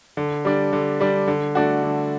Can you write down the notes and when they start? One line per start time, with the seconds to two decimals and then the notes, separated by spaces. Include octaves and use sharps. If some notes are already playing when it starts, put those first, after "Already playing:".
0.17 D3
0.45 G3 D4
0.73 D3
1.00 G3 D4
1.28 D3
1.55 A3 D4 F#4
1.83 D3